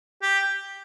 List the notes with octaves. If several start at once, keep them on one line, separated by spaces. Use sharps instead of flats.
G4